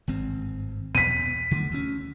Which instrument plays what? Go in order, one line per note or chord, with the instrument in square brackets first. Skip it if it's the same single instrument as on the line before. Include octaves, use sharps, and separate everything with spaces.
[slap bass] G#1 G2 C4
[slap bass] E2 B2 [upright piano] B6 D#7
[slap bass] D3 A3
D2 C#4